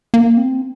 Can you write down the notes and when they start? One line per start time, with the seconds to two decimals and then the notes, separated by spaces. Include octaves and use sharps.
0.14 A#3
0.37 C4